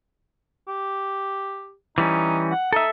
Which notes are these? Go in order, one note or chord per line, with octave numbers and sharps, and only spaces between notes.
G4
E3 G3 C#4 D#4
F#5
D#4 A4 E5